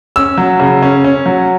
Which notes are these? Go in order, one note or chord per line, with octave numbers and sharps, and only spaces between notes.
C#4 E6
F#3
C#3
C#4
C#4
F#3